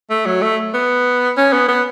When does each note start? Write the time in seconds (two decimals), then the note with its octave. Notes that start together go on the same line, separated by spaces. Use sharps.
0.10 A3
0.26 F#3
0.42 A3
0.74 B3
1.37 C#4
1.53 B3
1.68 B3